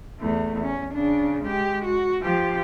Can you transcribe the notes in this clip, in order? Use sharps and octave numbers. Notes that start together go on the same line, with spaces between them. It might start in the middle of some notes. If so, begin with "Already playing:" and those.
E2 A3
C#4
C#3 D4
G#3 G4
F#4
F3 G4